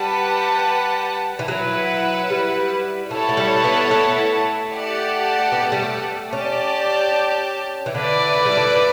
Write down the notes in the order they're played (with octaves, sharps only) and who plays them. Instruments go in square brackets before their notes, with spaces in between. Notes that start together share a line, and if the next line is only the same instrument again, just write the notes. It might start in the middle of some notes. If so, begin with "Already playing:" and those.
Already playing: [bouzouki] G3 [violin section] G4 B4 F#5 A5
[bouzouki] E3
[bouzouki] F#3 [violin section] E4 B4 F#5
[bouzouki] G3
[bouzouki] A3 [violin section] E4 A4 C#5 F#5 A5
[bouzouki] A3
G3
B3
A3
[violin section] G4 D5 F#5 A5
[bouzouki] B3
A3
G3
A3
[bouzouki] C#4 [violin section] G4 D5 A5
[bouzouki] E3
[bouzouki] D3 [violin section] E4 B4 D5
[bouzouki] A3
G3
A3
B3